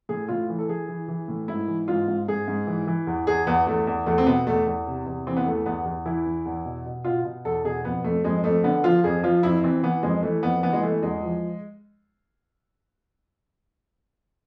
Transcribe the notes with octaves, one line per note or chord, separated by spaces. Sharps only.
A2 G#4
A2 F4
E3
A4
E3 G#4
E3
E3
A2
G#2 E4
E3
G#2 F4
G#2
G#2 G#4
G#2
E3
E3
E2
E2 G#4
E2 B3
E2 A3
E2
E2 A3
C4
B2 B3
E2 A3
E2
C3
E2
E3 C4
B3
E2 A3
E2 B3
E2
E3 E4
E2
E2
B2
B2
B2 F4
B2
E2 A4
B2 G#4
F2 B3
F2 A3
F2 G#3
F2 A3
D3 B3
F3 F4
F2 G#4
F3 F4
F2 E4
E3 C4
E3 B3
F2 G#3
E3 A3
F2 B3
E3 B3
G#3
E3 A3
E2 G#3
F3